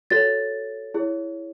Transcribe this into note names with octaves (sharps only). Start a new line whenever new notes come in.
F#4 A4 C#5 A6
E4 G#4 C#5